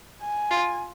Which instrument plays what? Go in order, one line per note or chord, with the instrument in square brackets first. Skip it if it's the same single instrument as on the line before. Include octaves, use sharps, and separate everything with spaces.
[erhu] G#5
[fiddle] F4